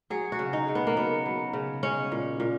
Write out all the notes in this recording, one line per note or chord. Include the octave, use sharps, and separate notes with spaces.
F#3 G#4
F#4
C#3
D#4
C#3
B3
A#3
F#3 B3
F#3
C#3
G#3 C#4
A#2
A#2